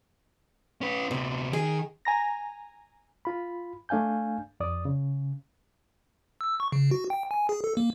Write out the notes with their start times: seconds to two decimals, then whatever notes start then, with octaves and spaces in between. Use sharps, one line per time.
0.81 C#4 B4
1.11 D2 C3 B3
1.53 D#3 G#4
2.05 G#5 A#5 A#6
3.25 F4 B5
3.89 A3 D4 F5 G#5 G6
4.60 F2 D5 D#6
4.85 C#3
6.41 E6
6.60 C#6
6.72 C#3
6.91 F#4
7.10 G5
7.31 G#5
7.49 G#4
7.64 A4
7.77 A#3